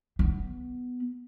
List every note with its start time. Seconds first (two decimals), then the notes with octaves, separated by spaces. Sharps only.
0.19 B3